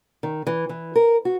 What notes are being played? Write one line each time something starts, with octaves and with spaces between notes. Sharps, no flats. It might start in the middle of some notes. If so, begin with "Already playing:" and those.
D#3
E3
E3
A#4
F#4